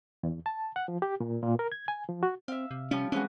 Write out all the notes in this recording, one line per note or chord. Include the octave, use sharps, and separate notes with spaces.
E2
A5
F#5
F3
G4
A#2
A#2
A#4
G#6
G#5
F3
F#4
C4 E5 F5
C3
F3 G3 C#4 F4
E3 G#3 C4 C#4 F#4